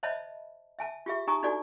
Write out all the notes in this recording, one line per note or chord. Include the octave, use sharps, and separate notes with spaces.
C5 C#5 D#5 E5 A5 B5
E5 G#5 A5
F4 G4 G#4 E5
D#4 G4 G#5 A#5 C#6 D#6
D4 D#4 F#4 A4 D5 G#5